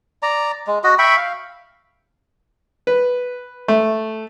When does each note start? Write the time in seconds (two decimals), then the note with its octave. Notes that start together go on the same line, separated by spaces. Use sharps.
0.23 D5 A#5
0.67 G#3
0.84 F#4 D#5
0.98 E5 G5 B5 C#6
1.17 F5
2.87 B4
3.68 A3